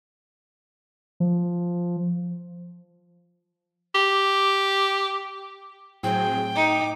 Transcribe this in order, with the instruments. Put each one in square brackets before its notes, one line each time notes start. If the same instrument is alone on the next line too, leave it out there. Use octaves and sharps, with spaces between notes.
[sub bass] F3
[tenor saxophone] G4
[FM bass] A2 [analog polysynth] F#3 C4 G#4 [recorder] G5
[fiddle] D#4 [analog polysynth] D6